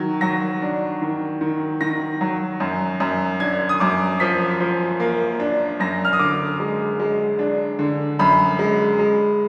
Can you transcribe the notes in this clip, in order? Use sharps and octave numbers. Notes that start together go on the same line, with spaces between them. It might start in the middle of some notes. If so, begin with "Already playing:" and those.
Already playing: D#3 F#3
F#3 A#6
D4
D#3
D#3
D#3 A#6
F#3
F#2
F#2
D4 G#6
D#6
F#2 D6
F3 B6
F3
A#3
D4
F#2 A#6
F6
D#6
D3 D6
G#3
G#3
D4
D3
F#2 B5
G#3
G#3